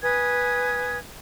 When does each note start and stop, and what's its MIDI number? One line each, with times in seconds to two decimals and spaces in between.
0.02 0.98 71
0.02 0.98 80
0.02 0.98 87
0.02 0.98 92